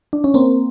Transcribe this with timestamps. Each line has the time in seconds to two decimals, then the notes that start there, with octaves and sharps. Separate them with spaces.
0.13 D4
0.24 C#4
0.34 A#3 C4